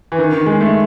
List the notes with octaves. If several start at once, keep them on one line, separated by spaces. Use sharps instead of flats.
E3
D#3
D#3
G#3
A3